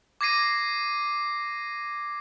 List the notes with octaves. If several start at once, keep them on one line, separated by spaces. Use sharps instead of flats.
D6 G#6 A#6 C7 D#7